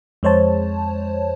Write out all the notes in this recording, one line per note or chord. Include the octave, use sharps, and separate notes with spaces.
F2 G#3 C5 C#5 A5